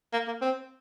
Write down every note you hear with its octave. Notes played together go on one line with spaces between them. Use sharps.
A#3
A#3
C4